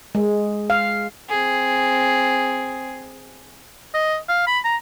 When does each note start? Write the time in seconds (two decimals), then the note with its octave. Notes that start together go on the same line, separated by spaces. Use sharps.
0.15 G#3
0.70 F5
1.29 C4 G#4
3.94 D#5
4.29 F5
4.47 B5
4.65 A#5